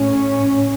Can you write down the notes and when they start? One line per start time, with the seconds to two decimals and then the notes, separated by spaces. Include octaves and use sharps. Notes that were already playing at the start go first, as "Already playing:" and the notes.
Already playing: A2 C#4